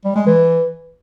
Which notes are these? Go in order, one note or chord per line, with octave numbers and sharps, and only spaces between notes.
G3
G#3
E3